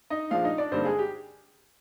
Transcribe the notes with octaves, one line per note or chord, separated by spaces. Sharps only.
D#4 D#5
A#2 F3 G#3 D4 F4 F5
D#4 D#5
D4 D5
G2 D3 G3 A#3 C4 D#4 C5
G#3 G#4
G4